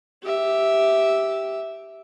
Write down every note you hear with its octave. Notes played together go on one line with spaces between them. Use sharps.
G4 E5